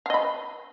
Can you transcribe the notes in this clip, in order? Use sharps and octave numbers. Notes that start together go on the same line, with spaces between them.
D#5 F5 B5